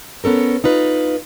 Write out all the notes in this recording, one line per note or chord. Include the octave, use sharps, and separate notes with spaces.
B3 C#4 A4 A#4
D#4 F4 B4